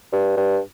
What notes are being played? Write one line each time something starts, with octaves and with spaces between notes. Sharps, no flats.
G2
G2